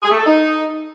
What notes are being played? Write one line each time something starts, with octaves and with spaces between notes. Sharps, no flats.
G#4
A3
A4
D#4